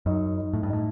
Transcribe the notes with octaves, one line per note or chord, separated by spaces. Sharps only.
F#2 D#4
D#4
A2
G2
A2 D#4